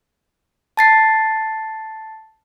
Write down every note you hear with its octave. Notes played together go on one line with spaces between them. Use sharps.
A5 A6 C7